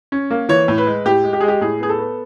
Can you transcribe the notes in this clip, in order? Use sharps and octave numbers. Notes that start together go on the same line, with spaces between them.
C#4
A#3
E3 C#5
A2
B4
G#3
A2 G4
G#3
G4
G#3 G#4
G4
A2 G#4
B3 G#4
A4
B3